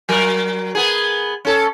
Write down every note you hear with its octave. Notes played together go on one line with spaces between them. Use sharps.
F#3 A#4
B3 G#4
C#4 A4